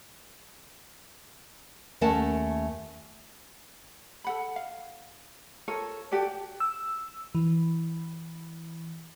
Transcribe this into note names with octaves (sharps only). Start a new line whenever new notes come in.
D#2 A3 C#4 A#4 F#5 A5
A4 F#5 B5
F5
F4 A4 A#4 C#5
F#4 G4 A4 D5
E6
E3